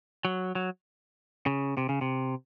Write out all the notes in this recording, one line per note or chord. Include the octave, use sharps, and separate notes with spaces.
F#3
F#3
C#3
C3
C#3
C3